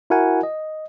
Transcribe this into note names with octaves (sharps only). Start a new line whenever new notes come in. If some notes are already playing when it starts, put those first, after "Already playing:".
E4 F#4 A#4 F#5 G#5
D#5